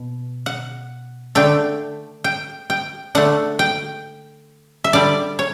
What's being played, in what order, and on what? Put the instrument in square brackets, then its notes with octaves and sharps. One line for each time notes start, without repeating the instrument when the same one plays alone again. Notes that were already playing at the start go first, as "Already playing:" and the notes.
Already playing: [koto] B2
F#5
D3 A3 G5
G5
G5
D3 A3 F#5
G5
E5
D3 G3 D5
C#5